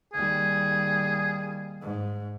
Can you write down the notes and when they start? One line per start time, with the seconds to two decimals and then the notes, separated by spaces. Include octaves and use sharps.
0.14 D#2 G3 G#4
1.82 G#2